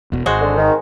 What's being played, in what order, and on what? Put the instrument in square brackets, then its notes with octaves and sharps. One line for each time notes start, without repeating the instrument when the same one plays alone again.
[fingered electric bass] E1 B2
[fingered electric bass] G#1 [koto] G#3 F#4 C5
[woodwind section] D3
D#3